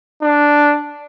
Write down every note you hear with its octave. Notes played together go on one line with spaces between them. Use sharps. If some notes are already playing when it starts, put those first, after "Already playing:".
D4